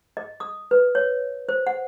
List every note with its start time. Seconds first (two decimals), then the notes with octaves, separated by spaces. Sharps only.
0.17 D#5
0.40 D#6
0.71 B4
0.95 C#5
1.49 C5
1.67 F#5